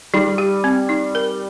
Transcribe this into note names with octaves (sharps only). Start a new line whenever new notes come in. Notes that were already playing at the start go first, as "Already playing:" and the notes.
G3 D#4
G4
C4
D#4
A#4